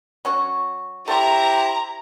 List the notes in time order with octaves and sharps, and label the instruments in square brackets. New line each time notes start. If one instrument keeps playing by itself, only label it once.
[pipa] F#3 C#4 F#4
[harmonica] E4 G4 C5 [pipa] A4 F#5 C6 [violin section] A#5